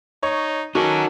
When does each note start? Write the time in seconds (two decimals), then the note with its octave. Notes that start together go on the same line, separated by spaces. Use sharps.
0.23 D#4 C#5
0.75 F#3 C#4 D#4 F#4 A4 A#4 D6